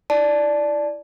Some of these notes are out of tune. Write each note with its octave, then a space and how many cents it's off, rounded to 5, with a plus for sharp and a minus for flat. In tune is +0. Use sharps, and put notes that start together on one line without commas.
E4 +0 D5 +0 A5 -15